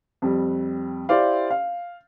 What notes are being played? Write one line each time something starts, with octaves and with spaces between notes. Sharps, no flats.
F2 G3
E4 G4 C5 D5 F5
F5